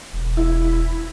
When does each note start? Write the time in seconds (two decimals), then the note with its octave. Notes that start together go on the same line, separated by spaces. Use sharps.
0.13 E1
0.37 E4